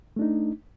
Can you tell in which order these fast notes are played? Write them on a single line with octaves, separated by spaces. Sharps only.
A3 D4 D#4